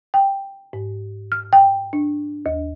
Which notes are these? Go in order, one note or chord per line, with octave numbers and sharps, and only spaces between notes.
G5
G#2
F6
G5
D4
D#2